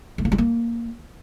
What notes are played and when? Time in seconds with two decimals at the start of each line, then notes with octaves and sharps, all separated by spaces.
0.18 A3
0.25 A#3
0.32 G3
0.38 A#3